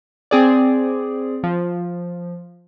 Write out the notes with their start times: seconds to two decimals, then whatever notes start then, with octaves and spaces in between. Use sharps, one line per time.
0.31 C4 G#4 D5
1.43 F3